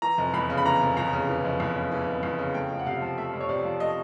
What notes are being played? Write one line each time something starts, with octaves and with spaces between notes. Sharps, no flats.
E3 A#5
F1
E2 B5
C#3
B5
E3 A#5
F1
E2 A#5
C#3
E3
F1
E2
C#3
E3
F1
E2
C#3
A3 G5
F2
F#5
C3 F5
F3
A3 E5
F2
C#5
C3 D5
F3
A3 D#5